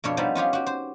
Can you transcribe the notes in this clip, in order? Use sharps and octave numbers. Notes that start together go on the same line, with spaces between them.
F2 B2 D4 C#5
F3 G3 B3 C4 D#4
C#4 F4 G4 G#4
F#4 G4
C5